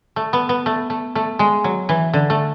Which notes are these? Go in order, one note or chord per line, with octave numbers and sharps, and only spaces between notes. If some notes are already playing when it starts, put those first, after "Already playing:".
A3
B3
B3
A3
A3
A3
G#3
F#3
E3
D3
A3